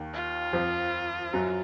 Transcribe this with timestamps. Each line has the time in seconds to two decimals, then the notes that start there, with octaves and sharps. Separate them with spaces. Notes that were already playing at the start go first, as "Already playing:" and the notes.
Already playing: D#2 D#3
0.14 F4
0.53 F2 F3
1.33 F#2 F#3